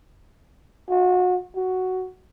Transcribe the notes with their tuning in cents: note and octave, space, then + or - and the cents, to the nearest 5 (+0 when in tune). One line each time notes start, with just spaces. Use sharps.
F#4 -30
F#4 +5